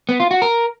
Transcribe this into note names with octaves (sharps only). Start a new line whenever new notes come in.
B3
F4
F#4
A#4